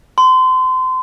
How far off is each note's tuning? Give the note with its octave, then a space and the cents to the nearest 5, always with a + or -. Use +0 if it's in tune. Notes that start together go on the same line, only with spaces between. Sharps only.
C6 -30